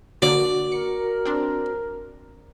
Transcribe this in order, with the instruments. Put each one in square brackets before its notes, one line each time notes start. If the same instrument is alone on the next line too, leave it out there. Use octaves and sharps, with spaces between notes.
[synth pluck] D3 A#3 [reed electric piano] F#4 [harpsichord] D5
[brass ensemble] A#4 [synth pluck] C#7
[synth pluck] C4 D4